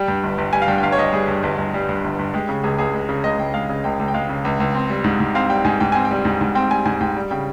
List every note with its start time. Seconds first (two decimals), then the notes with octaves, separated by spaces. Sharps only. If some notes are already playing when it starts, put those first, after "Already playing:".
Already playing: G3 G5
0.08 G2
0.23 G1
0.38 G1
0.53 G3 G#5
0.62 F5
0.68 G2 G5
0.78 G5
0.83 G1 F5
0.92 C#5
0.98 G1 D#5
1.13 G3 G#4
1.28 G2
1.43 G1
1.58 G1
1.74 G3
1.89 G2
2.04 G1
2.19 G1
2.34 G#3 G4
2.49 C#3
2.64 C#2 G#4
2.78 C#2 G#4
2.94 G#3
3.09 C#3
3.24 C#2 D#5
3.39 C#2 G5
3.54 G#3 F5
3.69 C#3
3.84 C#2 G5
3.99 C#2
4.08 G5
4.14 G#3 F5
4.29 C#3
4.45 C#2
4.60 C#2
4.75 C4
4.90 G3
5.04 G#2
5.20 G#2
5.35 C4 F5
5.50 G3 G5
5.65 G#2 G#5
5.80 G#2 G5
5.92 C4 G#5
6.05 G5
6.11 G3
6.25 G#2
6.41 G#2
6.55 C4 G5
6.71 G3 G#5
6.86 G#2 G#5
7.01 G#2 G5
7.16 G3
7.31 C#3 G5